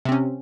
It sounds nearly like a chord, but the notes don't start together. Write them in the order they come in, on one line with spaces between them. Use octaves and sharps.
C3 C4 C#4